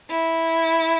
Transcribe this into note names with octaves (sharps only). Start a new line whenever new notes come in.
E4